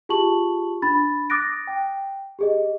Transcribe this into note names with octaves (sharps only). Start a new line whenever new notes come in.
F4 G4 G#4 A5 C#6 F#7
D4 B5 A6
D6 D#6 F#6 A6 A#6 D7
G5
G4 G#4 D#5